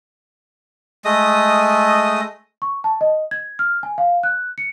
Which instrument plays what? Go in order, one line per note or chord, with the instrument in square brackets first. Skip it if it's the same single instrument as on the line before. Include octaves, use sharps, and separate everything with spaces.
[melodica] G#3 A3 D#5 D#6
[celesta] C#6
A5
D#5
G#6
F6
G#5
F5
F#6
C#7